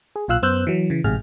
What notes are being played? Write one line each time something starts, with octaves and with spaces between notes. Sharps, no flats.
G#4
B1 A#2 F4 F5 E6 F#6
F#2 B3 C5 E6 F#6 G6
E3 F#3
C#3 E3
A1 G#2 C3 G#4 F6